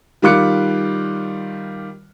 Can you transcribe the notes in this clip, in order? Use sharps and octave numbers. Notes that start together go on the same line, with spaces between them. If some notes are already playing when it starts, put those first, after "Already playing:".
D#3 G3 F4 D6 F#6 C#7